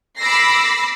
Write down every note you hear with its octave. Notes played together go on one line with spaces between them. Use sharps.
B5 D6 E6 A#6 C7